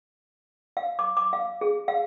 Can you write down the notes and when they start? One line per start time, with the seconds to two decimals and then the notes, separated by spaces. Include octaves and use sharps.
0.77 F5
0.99 D6
1.17 D6
1.33 F5
1.61 G#4
1.88 F5